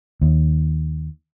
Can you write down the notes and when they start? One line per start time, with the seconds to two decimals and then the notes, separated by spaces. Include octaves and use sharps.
0.22 D#2